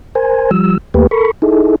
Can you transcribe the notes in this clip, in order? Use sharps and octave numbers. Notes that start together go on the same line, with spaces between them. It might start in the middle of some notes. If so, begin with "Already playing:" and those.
A#4 C5 G#5
F3 G3 E6
D#2 A3 A#3 G4 B4
A4 A#4 B5 C#6
D#4 E4 G#4 A4